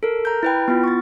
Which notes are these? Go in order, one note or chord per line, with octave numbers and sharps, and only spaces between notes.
A4 A#4
A#5 G6
E4 B4 G5
B3 E4 F4
C#6 A6